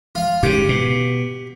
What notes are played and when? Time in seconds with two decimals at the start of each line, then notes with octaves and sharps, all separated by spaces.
0.15 F4 F5
0.43 G#2 C#3 G4
0.69 B2